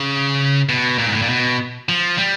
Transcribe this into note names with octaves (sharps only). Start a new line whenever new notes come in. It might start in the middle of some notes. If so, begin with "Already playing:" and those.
Already playing: C#3
B2
A#2
G#2
A2
A#2
B2
F3
G3